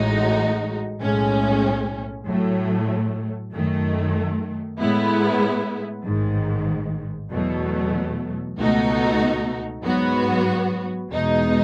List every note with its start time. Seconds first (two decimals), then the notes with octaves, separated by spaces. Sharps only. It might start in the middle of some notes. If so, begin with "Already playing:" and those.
Already playing: A1 A2 G#3 D#4 F#4
1.00 B1 A2 G#3 C#4
2.26 A2 F#3 A3
3.52 F#2 D#3 A3
4.78 A2 G#3 B3 E4
6.04 A1 G#2 D#3
7.31 E2 B2 F#3 A3
8.57 C#2 B2 A3 D#4 F#4
9.83 G#2 F#3 B3 F#4
11.10 E2 B2 G#3 D#4